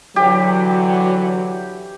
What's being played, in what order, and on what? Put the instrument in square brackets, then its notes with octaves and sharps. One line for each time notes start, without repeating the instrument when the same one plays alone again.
[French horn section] D3 E3 F#3 [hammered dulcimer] G4